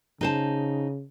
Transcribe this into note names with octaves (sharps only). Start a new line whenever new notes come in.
C#3 D#4 C5 A5